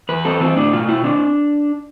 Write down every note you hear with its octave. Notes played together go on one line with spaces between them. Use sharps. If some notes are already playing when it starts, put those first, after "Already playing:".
E2 B4
C4 A4
E3 C4
A2 D4
B2 F4
B2 E4
C4 D4